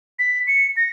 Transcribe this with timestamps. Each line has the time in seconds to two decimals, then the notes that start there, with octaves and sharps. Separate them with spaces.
0.19 B6
0.47 C#7
0.77 A#6